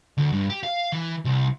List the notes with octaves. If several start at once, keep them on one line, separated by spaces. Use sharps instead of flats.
D2
G2
G4
F5
E3
C2